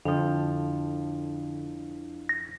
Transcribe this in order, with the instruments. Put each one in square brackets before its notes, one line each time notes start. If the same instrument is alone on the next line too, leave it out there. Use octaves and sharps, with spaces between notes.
[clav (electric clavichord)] F2 F3 [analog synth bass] D3 [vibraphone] D4 E4
[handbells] A#6